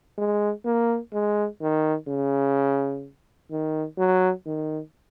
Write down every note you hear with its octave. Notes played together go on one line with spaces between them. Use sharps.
G#3
A#3
G#3
D#3
C#3
D#3
F#3
D#3